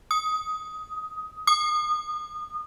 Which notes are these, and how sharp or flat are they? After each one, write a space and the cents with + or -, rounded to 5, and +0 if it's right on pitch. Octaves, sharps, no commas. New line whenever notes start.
D#6 +15
D#6 -30